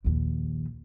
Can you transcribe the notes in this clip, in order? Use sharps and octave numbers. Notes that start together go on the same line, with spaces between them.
A#1 D#2